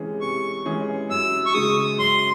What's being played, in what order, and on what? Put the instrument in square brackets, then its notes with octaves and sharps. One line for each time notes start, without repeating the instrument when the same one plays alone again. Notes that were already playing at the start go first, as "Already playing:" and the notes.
Already playing: [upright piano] C3 E3 G#3 C#4 G#4
[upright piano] C3 [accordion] C#6
[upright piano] E3 G#3 C#4 G#4
[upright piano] F#2 [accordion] E6
[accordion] C#6
[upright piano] C#3 G#3 [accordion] D#6
[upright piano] F#2 [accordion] C6